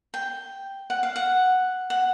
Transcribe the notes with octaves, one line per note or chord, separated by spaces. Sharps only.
G5
F#5
F5
F#5
F#5